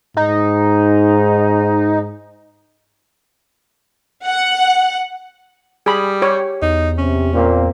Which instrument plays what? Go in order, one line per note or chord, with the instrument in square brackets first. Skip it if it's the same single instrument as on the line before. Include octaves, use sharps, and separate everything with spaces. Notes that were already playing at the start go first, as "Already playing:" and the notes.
[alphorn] G#2 [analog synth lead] D#4
[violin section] F#5
[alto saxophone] G3 [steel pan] G#4 B5
[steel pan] G4 C#5
[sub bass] E2 [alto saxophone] D#4
[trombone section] C3 [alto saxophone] C#4
[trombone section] A#2 A#3 C4